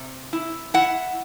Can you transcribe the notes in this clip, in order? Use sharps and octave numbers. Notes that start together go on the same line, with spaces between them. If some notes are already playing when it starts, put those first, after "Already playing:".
Already playing: C3
E4
E4 F#5